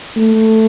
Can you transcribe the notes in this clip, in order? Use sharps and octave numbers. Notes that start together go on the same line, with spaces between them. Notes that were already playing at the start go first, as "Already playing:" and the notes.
A3